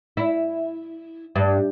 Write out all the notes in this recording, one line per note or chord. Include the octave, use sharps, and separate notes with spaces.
E4
G2